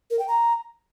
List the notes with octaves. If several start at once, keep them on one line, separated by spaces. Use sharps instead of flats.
A#4
G5
A#5